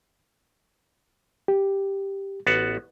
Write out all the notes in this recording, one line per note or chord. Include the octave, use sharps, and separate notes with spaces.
G4
A1 B3 F#4 A6